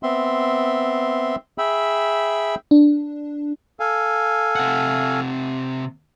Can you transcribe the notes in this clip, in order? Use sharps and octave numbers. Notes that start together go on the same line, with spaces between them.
B3 C4 E5 C6
G#4 E5 G5 B5 E6
D4
A4 F5 G#5
C3 F#5